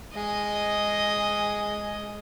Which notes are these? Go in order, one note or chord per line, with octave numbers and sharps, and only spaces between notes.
G#3 D#5